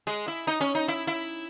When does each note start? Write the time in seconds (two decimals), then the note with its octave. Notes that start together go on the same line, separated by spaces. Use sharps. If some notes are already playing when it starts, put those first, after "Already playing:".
0.07 G#3
0.28 E4
0.47 D#4
0.61 C#4
0.75 D#4
0.88 E4
1.07 E4